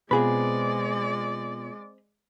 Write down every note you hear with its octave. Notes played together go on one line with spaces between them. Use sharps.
B2 G#3 B3 C4 F4 G#4 B4 D5